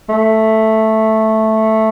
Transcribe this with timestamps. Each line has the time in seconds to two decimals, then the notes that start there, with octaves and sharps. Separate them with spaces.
0.09 A3